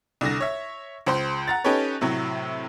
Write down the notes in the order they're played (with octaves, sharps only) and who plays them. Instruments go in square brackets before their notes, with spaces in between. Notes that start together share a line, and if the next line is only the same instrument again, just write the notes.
[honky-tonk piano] C2 D3 A#6
C#5 E5
C#2 C5 C6
F#5 A#5 A6
C#4 D#4 G4 A4 B4 C#5
A2 C3 F#3